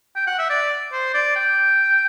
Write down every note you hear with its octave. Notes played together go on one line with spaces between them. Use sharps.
G5
F#5
E5
D5
C5
D5
G5